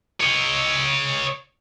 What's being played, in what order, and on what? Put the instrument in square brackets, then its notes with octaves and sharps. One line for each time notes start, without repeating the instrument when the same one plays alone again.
[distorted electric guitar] C#5 D#5